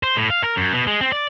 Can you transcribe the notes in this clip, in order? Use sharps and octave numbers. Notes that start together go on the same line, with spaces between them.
C5
A2
F5
A#4
F#2
B2
G#3
C4
D5